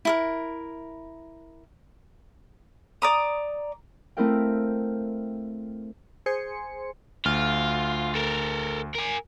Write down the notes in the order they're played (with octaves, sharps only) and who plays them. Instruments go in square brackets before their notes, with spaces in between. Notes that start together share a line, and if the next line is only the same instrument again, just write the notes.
[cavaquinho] E4 A4 A#4
[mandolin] D5 A#5 D#6
[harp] A3 C4 E4 A#4 F5 G5
[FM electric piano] G#4 C5 G#5 C6 C#7
[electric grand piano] D2 F6 [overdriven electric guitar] F4
[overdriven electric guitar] A4 A#4
A#4 G#5